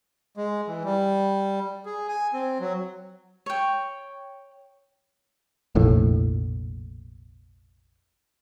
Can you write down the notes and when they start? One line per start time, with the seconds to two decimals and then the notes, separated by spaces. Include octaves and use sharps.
0.37 G#3
0.68 E3
0.84 G3
1.86 G#4
2.09 G#5
2.33 C4
2.60 F#3
3.46 C#5 G5
5.75 F1 A#1 A2